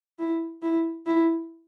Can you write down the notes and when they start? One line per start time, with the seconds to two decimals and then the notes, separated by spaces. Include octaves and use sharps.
0.19 E4
0.63 E4
1.06 E4